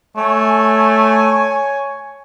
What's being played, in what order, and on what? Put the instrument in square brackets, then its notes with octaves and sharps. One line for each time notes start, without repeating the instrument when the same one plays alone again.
[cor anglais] A3 [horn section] C#5 G#5